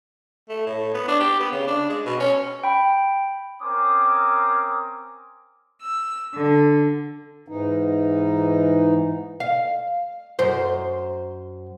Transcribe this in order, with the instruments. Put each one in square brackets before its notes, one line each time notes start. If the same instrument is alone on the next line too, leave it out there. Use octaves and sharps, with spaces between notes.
[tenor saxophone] A3
A2
B3
D4
G4
B3
C#3
D4
G#3
B2
C#4
[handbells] G5 B5
[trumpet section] C4 C#4 A#4 C5 D6 D#6
[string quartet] E6
D3
[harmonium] G#2 E3 D#4
[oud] F5
F#2 C5